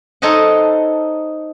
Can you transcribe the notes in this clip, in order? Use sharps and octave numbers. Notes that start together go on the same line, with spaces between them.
D#4 A4 C5 C#5 D#5 F#5